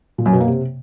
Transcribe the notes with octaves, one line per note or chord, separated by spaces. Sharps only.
A#2
F#2
B2
A#3
C3